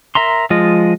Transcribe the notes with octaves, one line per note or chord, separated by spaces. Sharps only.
A#4 E5 A#5 C6
F3 G#3 F4 D#5